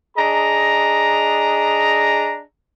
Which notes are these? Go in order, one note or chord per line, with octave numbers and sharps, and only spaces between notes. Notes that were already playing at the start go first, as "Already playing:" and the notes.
D4 G#4 D#5 A#5